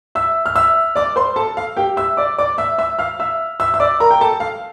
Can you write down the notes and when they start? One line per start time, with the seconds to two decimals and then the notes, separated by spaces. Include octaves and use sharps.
0.15 E5 E6
0.46 F6
0.56 E5 E6
0.96 D5 D6
1.16 C5 C6
1.36 A4 A5
1.57 F5
1.77 G4 G5
1.97 E5 E6
2.17 D5 D6
2.38 D5 D6
2.58 E5 E6
2.78 E5 E6
2.99 F5 F6
3.19 E5 E6
3.60 E5 E6
3.74 E6
3.80 D5 D6
4.00 A#4 A#5
4.11 G5
4.21 A4 A5
4.40 F5